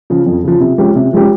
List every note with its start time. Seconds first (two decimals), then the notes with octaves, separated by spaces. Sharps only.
0.10 C#3 F3
0.26 F2
0.44 C#3 F3
0.61 C3
0.78 F3 G#3 C#4 G4
0.96 C3
1.13 F3 G#3 C#4 G4